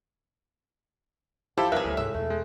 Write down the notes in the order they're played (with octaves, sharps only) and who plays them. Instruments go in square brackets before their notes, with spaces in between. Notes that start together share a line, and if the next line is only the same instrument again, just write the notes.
[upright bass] A1 [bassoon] F3 [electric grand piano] E4 G4 C5 [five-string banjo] A4
[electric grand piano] C2 A#4 E5 [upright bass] F2 [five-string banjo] G#4 B4
[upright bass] D2 G3 [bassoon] A2
[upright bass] C2 G#2 [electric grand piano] G#3 [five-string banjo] E5
[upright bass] E2 B2 [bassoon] A3
[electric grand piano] G#3